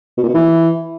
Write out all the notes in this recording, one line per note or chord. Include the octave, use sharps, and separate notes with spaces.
B2
A#2
B2
E3